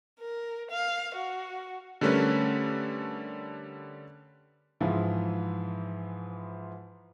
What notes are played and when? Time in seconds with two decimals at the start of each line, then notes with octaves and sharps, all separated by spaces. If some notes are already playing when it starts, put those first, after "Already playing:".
0.20 A#4
0.71 F5
1.15 F#4
2.01 D3 G3 A3 C#4 A#4 B4
4.80 G#2 E3 F3 E4